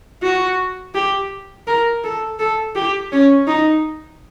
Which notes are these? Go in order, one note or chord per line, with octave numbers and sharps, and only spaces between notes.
F#4
G4
A#4
A4
A4
G4
C#4
D#4